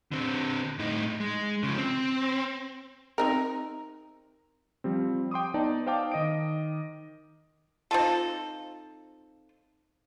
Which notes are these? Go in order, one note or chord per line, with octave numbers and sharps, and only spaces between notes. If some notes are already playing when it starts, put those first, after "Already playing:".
D3 C4
A2 D#4
G#3
C#3 F3
C4
C4 D#4 A#4
F3 G3 C4
G5 C6 D6 D#6
B3 D#4 D5 A5
C5 F5 G5 A5 D6
D#3 D#5 D#6 D7
C4 D#4 F4 A4